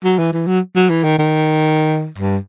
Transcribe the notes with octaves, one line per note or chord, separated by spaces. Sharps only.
F#3
E3
E3
F#3
F#3
E3
D#3
D#3
G2